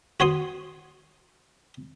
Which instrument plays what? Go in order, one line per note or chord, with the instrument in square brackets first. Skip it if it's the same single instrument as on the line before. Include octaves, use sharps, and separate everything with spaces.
[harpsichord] F#4 C#5 C6 D#6